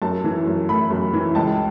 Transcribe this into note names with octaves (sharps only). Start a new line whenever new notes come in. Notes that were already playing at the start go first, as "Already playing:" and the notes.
F#2 A5
E3
F#2
A3 B5
F#2
E3
C#2 A5